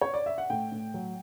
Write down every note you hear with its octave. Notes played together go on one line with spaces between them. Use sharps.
C#5
D5
E5
F#5
A2 G5
A2
F#3